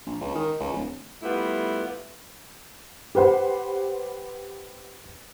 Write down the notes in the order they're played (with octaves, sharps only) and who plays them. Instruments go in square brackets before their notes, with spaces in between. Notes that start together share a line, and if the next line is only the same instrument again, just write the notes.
[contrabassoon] A#1
C#2
D#3
C#2
D1
[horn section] G3 A3 B3 E4 F4 G4
[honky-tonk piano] G4 B4 C5 F#5